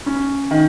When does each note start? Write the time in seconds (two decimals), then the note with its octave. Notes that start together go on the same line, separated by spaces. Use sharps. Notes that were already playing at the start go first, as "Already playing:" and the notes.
0.06 C#4
0.51 D#3